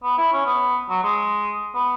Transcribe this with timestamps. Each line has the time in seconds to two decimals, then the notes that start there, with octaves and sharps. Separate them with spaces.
0.03 B3
0.18 E4
0.33 C#4
0.46 B3
0.90 F#3
1.03 G#3
1.75 B3